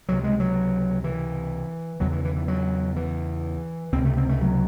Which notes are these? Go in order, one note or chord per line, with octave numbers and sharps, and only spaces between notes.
C#2 C3 F#3
G#3
F#3
E3
E2 C#3 F#3
E3
E3
E3
F#3
E3
C#2 C4
C3
A3
C4
A3
F#3